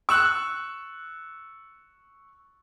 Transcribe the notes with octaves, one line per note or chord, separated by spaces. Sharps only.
C#6 E6 F#6